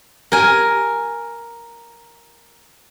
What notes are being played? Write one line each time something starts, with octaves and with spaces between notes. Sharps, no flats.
A#4 G#5